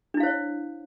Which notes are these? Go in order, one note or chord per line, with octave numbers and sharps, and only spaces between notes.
D4 E4 C5 C#5 F5